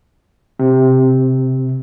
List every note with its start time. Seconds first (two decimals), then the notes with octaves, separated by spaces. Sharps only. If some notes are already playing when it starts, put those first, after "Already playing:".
0.59 C3